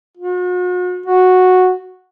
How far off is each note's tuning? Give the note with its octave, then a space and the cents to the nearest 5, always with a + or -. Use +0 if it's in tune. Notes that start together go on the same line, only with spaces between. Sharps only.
F#4 -40
F#4 -5